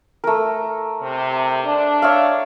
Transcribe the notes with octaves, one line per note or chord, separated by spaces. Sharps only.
A3 A#4
C3
D4
C#5 E5 F5